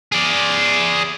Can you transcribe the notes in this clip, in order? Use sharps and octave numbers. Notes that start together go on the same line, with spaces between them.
G#4 D5